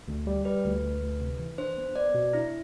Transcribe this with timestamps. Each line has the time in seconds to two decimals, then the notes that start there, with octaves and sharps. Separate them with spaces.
0.08 D2
0.27 G3
0.45 G3 B4
0.65 D2
0.83 D2
1.02 D2
1.20 C3
1.40 E3
1.58 D4 C5
1.78 B3
1.96 B3 D5
2.14 B2
2.33 D4 E4